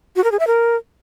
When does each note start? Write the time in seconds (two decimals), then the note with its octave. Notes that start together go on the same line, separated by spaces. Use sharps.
0.16 F#4
0.24 A#4
0.32 G#4
0.39 E5
0.47 A#4